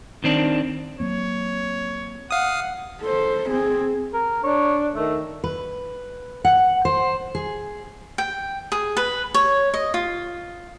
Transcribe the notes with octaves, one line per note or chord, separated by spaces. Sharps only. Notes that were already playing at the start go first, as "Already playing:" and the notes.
D#3 C4 D4
F#3 A#3 C4 C#5
F5 F#5 D#6
A4 C5
C4 G#4
A#4
D4 C#5
D#3 A3
B4
F#5
C5
G#4
G5
G#4
B4
C#5
D#5
F4